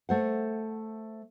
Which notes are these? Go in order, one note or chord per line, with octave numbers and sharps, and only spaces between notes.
A3 C5 F#5